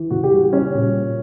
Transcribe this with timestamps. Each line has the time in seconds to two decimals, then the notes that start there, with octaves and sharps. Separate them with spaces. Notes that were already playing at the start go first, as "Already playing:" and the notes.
Already playing: E3
0.10 C#3 F#4
0.24 G4
0.31 G3 F#4
0.53 G3 C#4
0.74 A#2
0.94 G3